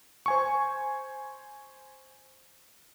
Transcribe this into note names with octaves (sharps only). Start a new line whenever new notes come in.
C5 G#5 C#6